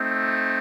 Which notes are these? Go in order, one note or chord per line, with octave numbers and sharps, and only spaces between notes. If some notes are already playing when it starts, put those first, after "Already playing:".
Already playing: A3 C4 D#4